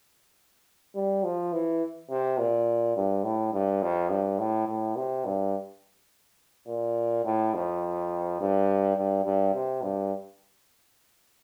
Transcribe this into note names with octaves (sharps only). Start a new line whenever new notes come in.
G3
F3
E3
C3
A#2
G2
A2
G2
F2
G2
A2
A2
C3
G2
A#2
A2
F2
G2
G2
G2
C3
G2